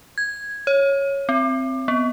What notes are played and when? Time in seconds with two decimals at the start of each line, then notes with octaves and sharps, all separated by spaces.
0.18 G#6
0.67 C#5
1.29 C4
1.88 B3